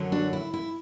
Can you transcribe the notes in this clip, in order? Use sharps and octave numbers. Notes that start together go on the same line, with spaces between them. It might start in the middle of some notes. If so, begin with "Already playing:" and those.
Already playing: F#2 D3 F#3 C#4
D4 F#4
E4
E4